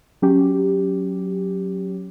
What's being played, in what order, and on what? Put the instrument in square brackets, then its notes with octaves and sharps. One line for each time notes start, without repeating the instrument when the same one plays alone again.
[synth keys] F#3 C#4 G4